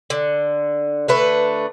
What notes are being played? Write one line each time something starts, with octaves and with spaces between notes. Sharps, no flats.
D3
D3 A3 B4